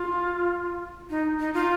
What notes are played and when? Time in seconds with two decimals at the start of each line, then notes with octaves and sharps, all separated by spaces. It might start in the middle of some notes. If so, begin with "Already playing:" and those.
Already playing: F4
1.10 D#4
1.40 D#4
1.54 F4